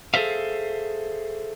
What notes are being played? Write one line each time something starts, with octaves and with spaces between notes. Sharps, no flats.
G#4 A4 B4 C5 E5 F5